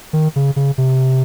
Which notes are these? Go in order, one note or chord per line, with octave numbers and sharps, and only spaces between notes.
D#3
C#3
C#3
C3